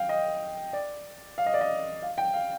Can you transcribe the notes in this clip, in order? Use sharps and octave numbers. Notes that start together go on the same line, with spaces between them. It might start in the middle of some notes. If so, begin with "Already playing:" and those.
Already playing: F5 G5
D#5
D5
F5
D#5
D5
D#5
F5
G5
F5